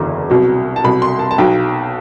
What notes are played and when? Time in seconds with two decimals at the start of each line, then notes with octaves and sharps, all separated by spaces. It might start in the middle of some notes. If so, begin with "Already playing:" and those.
Already playing: F#1 E2 D3 F#3
0.30 C2 B2 F#3
0.76 A5
0.84 C2 B2 F#3 B5
1.02 C6
1.19 A5
1.31 A5
1.38 B1 B2 F#3 G5